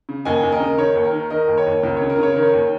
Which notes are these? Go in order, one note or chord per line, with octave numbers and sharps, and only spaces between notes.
C#3
D#2 D#5 G#5
D#2
A#4 D#5
C#3
D#3 C#5
D#2 C#5
A#4
D#3
D#3 A#4 D#5
D#2
C#5
D#2
C#2 A#4
C#3 C#5
A#4
C#3 C#5
D#3 A#4
C#5
D#2